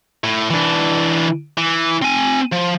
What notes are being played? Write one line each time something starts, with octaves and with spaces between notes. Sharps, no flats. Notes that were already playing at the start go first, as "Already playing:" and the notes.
A2
E3 D4
E3
C4 G#5
F3